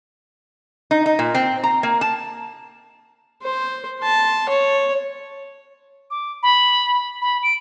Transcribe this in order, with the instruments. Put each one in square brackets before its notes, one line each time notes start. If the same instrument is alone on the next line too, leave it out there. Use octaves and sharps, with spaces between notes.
[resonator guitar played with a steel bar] D#4
D#4
A#2
C4
A#5
A#3
A5
[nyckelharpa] C5
A5 C6
C#5
[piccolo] D6
B5
B5
D7